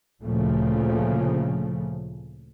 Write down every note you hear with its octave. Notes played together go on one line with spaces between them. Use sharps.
D2 A#2 C#3 F3 A3